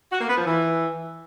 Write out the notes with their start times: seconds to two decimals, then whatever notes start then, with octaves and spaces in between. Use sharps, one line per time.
0.12 F#4
0.20 A#3
0.29 B3
0.38 F3
0.46 E3